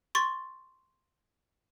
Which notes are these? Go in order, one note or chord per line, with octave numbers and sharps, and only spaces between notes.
C6 C#6 A6